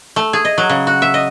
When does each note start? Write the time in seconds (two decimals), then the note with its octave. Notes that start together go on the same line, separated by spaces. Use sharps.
0.16 A3
0.33 G#4
0.45 D#5
0.58 F#3
0.69 C#3
0.87 F#4
1.02 E5
1.14 D#5